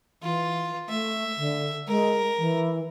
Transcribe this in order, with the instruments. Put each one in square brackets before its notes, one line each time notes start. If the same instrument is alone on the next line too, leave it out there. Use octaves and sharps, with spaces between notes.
[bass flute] E3 [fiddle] F4
[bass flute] A3 [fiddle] E5
[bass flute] D3
[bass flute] G#3 [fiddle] A#4
[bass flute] E3